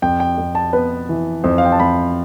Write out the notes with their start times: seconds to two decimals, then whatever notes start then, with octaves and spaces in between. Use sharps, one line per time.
0.02 F2 G5
0.20 G5
0.38 F2
0.55 A5
0.73 B3 B4
1.09 E3
1.44 F2 C5
1.58 F5
1.65 G5
1.72 A5
1.79 F2 B5